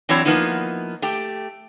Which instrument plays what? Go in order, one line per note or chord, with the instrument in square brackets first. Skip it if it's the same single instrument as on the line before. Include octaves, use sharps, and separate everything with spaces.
[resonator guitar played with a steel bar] E3 F#3 C4 D4 E4 C#5
F3 A#3 B3 D#4 E4
A3 G4 G5